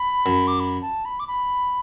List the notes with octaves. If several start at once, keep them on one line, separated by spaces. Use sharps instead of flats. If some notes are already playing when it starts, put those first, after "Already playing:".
Already playing: B5
F#2
D6
B5
A5
B5
D6
B5